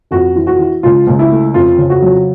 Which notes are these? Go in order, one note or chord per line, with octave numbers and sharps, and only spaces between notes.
F2 F#4
E3
F#4
E3
C#2 F4
C#2
E4
A3
F2 F4
C#3
F#4
F#3